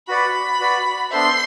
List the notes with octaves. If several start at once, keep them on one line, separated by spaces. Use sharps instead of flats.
F#4 B4 D5 F#5 B5
F#4 B4 D5 F#5
B3 D4 A4 C5 E5 C6